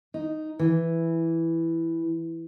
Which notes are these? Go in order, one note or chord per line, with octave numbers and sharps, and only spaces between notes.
D#4
E3